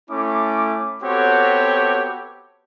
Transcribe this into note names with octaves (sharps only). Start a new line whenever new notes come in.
A3 C#4 E4 D6
B3 C4 F#4 G4 A4 C#5